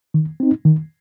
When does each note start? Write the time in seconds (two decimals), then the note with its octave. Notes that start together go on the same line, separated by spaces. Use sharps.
0.14 D#3
0.40 C4 D#4
0.65 D#3